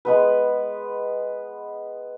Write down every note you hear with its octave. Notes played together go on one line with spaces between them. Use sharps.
G#3 B3 B4